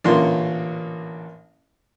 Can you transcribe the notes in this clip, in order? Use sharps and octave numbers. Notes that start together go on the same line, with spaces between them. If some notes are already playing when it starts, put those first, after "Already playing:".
A1 A#2 D3 A#3 C#4 C6